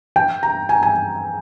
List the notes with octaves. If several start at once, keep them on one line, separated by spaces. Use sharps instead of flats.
G5
A#5
G#5
G#5